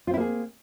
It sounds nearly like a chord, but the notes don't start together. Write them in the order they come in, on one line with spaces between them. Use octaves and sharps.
F4 C4 E4 A#3 G#4